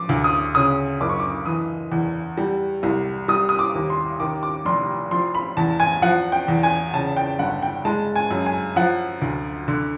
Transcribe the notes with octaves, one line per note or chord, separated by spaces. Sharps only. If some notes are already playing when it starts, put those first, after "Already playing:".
Already playing: F3 D6
D2
D#6
C#3 D#6
F#1 D6
C#6
D6
E3 D#6
E2
G3
C2
G3 D#6
D#6
D6
D#2
C6
D#3 D6
D6
F1 C6
F3 C6
B5
E2 A5
G#5
F3 F#5
G5
E2
G#5
C#3 A5
G5
G1 F#5
G5
G#3 A5
G#5
F#2
G#5
F3 F#5
D2
D3